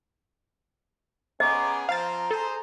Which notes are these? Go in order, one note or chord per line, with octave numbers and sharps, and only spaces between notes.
B3 C#4 G#4 D#5 A#5 C6 D6
F3 C4 F5 A#5 A6
G#4 A4 C5